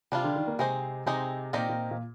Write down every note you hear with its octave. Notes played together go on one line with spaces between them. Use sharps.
C3 G3 D4 F4
D3
D#3
A#3
C3 G#3 C4 D#4 G#4 C5
C3 G#3 C4 D#4 G#4 C5
A#2 C4 D#4 G4 A#4 D5
A#2
A#2